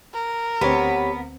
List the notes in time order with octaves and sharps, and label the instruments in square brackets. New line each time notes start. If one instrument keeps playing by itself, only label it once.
[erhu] A#4
[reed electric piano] D2 C4 [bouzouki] B3 [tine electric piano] G4 C#5